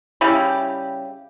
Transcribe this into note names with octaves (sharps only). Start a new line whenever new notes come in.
C#3 G3 E4 G4